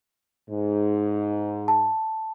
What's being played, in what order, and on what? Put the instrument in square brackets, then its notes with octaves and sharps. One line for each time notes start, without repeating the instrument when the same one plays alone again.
[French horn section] G#2
[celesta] A5